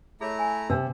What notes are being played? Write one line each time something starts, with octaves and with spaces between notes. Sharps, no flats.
A3 E4 G#4 C#5 A#5
G#5
C3 D4 E6